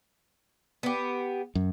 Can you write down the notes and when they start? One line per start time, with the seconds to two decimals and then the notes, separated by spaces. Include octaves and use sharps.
0.83 B3 G4
1.55 F#2